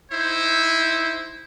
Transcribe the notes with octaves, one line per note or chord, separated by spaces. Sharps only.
D#4 E4 C5